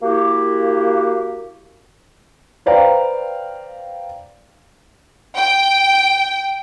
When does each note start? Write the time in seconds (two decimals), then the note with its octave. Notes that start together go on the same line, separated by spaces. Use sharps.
0.02 A#3 E4 F#4 G4
2.66 B4 C5 D5 F5 G5 A#5
5.37 G5